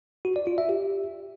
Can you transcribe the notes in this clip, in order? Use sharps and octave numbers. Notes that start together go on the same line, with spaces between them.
F#4
D5
F4
E5
G4